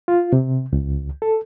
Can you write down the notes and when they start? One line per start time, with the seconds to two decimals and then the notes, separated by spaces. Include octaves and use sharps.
0.08 F4
0.33 C3
0.73 C#2
1.22 A4